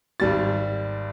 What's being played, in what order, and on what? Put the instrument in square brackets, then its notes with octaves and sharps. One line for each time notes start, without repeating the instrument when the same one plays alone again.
[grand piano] G#1 G3 A6